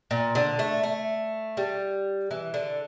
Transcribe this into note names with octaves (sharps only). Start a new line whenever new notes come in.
A#2
D3
A3
A3
G3
E3
D3